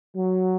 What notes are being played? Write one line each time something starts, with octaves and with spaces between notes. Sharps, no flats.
F#3